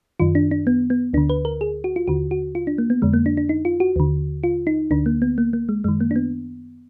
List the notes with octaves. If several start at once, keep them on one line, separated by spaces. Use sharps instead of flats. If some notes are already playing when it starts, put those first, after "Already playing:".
F#2 D#3 F4
D4
D4
B3
B3
D2 D3 D4
B4
A#4
G#4
F#4
F4
D#2 D3 F#4
F#4
F4
D4
A#3
B3
F2 D3 G#3
A#3
D4
D4
D#4
F4
F#4
D#2 D3
F4
D#4
D2 D3 D4
A#3
B3
A#3
A#3
G#3
F#2 D#3 G#3
A#3
D4
B3